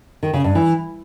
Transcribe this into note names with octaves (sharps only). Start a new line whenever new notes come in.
D#3
C#3
G2
E3